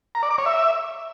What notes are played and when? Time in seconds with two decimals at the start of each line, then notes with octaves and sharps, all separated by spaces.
0.15 A#5
0.23 D5
0.30 D6
0.38 C#5
0.46 E5